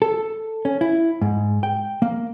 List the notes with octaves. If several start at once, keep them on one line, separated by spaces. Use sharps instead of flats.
A4
C#4
E4
G#2
G5
A#3